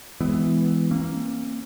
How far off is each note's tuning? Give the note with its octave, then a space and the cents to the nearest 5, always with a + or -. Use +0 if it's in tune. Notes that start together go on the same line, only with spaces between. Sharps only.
E3 -5 G#3 +0 B3 +20
A#3 +0 C#4 -45